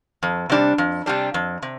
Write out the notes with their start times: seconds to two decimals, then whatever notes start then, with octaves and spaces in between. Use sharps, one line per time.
0.23 F2
0.49 C3 G3 D4
0.78 F2
1.06 C3 G3 D4
1.34 F2
1.62 C3